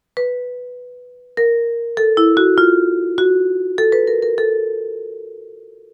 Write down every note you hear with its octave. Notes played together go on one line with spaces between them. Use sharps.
B4
A#4
A4
E4
F#4
F4
F#4
A4
B4
A#4
A#4
A4